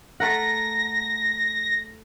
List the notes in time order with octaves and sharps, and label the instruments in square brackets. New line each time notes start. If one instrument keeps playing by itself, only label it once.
[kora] A3 A#4 F#5 [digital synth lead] A#6